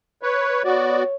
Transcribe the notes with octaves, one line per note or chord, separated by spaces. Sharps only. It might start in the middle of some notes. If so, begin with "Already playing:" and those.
B4 C#5
B3 F#4 C#5 D5